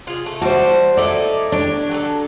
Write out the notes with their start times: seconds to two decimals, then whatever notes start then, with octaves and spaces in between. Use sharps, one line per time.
0.07 F4 G#4
0.26 A3
0.41 G3 F#4 C5 E5 A5
0.97 D#4 E4 A4 D5
1.52 D4 G4 C#5
1.91 F#3 A4